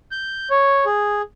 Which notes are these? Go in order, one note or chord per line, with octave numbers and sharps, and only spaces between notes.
G6
C#5
G#4